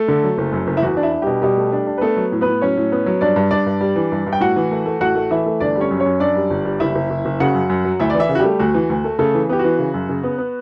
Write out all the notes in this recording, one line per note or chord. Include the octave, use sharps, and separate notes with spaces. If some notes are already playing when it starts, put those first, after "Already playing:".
Already playing: A3 A4
D3
F#3
F#1
F#2
F#1
E4
E2 F#4
D4
E4
D4
B2 G3 G4
B2 G3 G4
A3
D4
D4
B4
A3 B3 A4
F#3
A2
B3 B4
A2
F#3 C#4 C#5
A2
B3
F#3
G2 D4 D5
G2
G2 D4 D5
G2
G3
E3
G2
G2
G5
A2 F#4 F#5
E3
A3
A3
A1 F#4 F#5
A3
E3 E4 E5
A3
G1 D4 D5
G3
C#4 C#5
F#2
C#4 C#5
F#2
F#2 D4 D5
G3
G1
G3
F#1 E4 E5
F#1
F#1
F#1
C#3 F#4 F#5
F#2
F#2
F#3
D2 E4 E5
D5
E3
E4 E5
C#3
F#4
G3 A3 G4
D2 F#4
E3
D2
A3
C#3 A3 A4
E3
B3 G4
F#4
E3
C#3
F#2
C#3
B3
B3